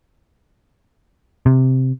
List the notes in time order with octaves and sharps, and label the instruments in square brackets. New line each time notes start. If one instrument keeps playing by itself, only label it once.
[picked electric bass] C3